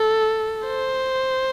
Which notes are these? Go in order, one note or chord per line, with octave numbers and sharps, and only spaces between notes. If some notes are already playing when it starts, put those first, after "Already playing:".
Already playing: A4
C5